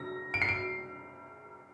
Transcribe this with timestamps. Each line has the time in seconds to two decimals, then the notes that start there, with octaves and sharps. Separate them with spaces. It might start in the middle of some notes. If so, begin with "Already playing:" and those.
Already playing: A#6
0.34 D7
0.42 C7
0.49 D7